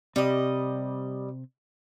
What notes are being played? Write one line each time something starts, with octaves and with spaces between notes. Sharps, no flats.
C3 G3 C4 D#5